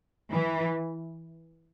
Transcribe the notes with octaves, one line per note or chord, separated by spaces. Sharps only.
E3